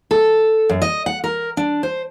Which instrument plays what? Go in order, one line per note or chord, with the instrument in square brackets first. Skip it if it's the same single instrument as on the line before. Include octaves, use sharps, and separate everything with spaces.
[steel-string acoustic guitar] A4
F#2
D#5
F#5
A#4
D4
C5